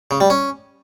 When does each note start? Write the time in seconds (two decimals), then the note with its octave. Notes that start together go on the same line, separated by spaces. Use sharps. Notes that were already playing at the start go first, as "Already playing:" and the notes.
0.11 C#3
0.20 G3
0.30 C#4